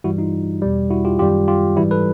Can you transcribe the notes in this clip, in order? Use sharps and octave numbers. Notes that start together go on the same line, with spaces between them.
G2 E3 G3 E4 F#4
D#4 F4
E2 B2 G3
E4 F#4
F4 G4
F#2 D#3 G3 F4 G4
F4 G4
G#2 E3 G3 E4 F#4
A4 B4